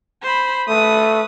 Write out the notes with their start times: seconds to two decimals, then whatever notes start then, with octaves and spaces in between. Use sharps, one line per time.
0.23 C5 B5
0.68 A3 B4 D#6